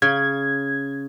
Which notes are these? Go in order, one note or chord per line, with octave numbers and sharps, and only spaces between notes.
C#3 G#6